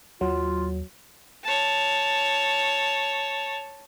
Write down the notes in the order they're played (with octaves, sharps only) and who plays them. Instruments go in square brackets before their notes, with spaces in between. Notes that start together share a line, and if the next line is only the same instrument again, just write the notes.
[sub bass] D#2 [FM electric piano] F#3 [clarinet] F4
[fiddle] C#5 A5